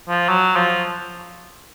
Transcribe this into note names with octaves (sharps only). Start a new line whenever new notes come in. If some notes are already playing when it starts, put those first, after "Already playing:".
F3
F#3
F3